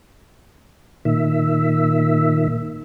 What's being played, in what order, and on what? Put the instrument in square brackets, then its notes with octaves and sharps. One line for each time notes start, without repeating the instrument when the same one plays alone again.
[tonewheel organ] A#2 D#3 E5